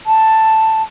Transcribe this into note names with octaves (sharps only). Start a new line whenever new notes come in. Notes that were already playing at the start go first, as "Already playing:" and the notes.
A5